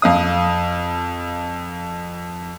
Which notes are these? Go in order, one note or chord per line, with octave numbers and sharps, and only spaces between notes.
F2 F5 D#6